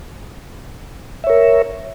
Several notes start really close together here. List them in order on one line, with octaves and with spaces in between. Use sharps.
E5 C#5 A#4